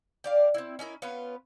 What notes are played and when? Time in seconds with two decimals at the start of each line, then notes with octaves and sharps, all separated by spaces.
0.24 G4 D5 F5
0.54 C4 E4
0.79 C#4 D#4 E4 A#4
1.02 B3 C#4 F4 B4